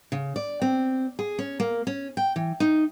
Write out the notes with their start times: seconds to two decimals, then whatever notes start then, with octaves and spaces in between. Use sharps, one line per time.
0.12 C#3
0.36 D5
0.62 C4
1.19 G#4
1.39 C#4
1.60 A#3
1.87 C#4
2.17 G5
2.36 E3
2.60 D#4